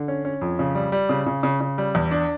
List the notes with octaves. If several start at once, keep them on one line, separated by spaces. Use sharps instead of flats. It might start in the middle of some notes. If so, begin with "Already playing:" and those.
Already playing: D3
C#4
C#4
F2
C#3
G3
G3
C#3
C#3
C#3
C#3
G3
E2
D4